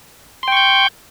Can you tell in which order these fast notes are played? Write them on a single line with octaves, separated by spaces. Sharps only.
C6 G5 C#6 G6